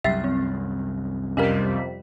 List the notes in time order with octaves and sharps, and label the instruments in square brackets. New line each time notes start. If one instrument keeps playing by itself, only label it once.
[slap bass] C2 F#2 [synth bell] F#3 A6 C7 [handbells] E5
[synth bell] C4
[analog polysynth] F2 C3 G3 [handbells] C#4 A#4 [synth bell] D#5 F5 B6